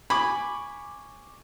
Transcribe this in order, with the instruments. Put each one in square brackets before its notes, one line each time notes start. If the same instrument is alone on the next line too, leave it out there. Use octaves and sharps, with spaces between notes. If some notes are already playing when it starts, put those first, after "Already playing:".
[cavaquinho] G#5 [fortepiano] B5 [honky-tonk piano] C#6 D6